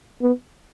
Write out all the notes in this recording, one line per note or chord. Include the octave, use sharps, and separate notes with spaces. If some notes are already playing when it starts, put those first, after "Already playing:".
B3